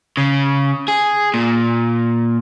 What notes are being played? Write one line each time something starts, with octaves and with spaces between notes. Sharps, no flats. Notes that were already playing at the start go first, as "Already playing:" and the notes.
C#3
G#4
A#2